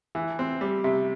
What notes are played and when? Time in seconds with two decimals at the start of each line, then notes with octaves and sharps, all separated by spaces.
0.15 E3
0.39 C4
0.61 G3
0.84 C3